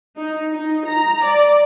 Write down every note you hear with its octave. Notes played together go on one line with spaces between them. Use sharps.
D#4
D#4
A#5
D5